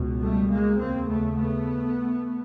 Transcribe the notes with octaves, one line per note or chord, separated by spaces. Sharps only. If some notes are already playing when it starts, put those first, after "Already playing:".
Already playing: C#2 B2
G3 A3
G#3 A#3
D#2 C#3 A#3 C4
A3 B3
A3 B3